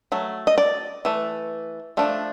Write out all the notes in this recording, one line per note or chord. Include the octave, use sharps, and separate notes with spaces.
F#3 A3
D#5
D5
E3 A3
F3 A3 D4